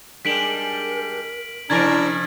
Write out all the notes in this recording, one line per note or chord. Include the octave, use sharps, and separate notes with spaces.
G3 G#3 D4 A#4 B6 D7 F#7
C3 F3 D4 E4 A#4 A#5 G#6 A6